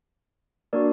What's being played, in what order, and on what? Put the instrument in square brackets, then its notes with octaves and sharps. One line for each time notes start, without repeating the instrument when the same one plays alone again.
[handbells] A#3 D4 F#4 A#4 D5